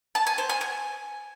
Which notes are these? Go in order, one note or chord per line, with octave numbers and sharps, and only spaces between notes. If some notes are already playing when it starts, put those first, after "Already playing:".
A5
G#5
C5
G#5
G#5